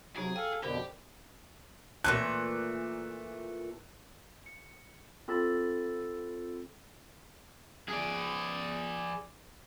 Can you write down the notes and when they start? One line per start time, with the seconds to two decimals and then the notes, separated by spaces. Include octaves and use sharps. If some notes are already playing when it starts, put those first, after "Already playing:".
0.16 C3 F#3 D#4 F#4 G#4 C#5
0.36 A4 F5 G5
0.63 F2 B2 D3 G4 A#4 C5 B5
2.04 A#2 E3 A3 F#6
4.46 C#7
5.28 C4 F4 A4 B5 E6 A6
7.89 G#4 D5